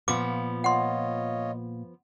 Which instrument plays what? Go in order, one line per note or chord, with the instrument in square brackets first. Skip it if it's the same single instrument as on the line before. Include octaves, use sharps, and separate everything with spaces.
[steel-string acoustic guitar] A#2 [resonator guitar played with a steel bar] F3 B3 [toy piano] D6
[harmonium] F4 C#5 D#5 [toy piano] F#5 C6